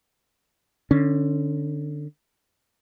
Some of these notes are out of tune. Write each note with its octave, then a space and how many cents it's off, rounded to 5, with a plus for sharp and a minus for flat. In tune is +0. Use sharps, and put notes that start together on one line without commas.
D3 +20 C#4 -5